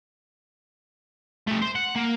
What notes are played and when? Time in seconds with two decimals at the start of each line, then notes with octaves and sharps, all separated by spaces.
1.47 A3 G4
1.62 C5
1.75 F#5
1.95 A#3